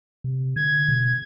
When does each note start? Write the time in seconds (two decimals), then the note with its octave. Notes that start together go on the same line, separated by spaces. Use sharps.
0.24 C3
0.56 D3 G#6
0.88 B2